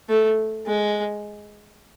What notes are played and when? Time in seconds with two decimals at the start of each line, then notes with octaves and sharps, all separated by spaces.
0.09 A3
0.67 G#3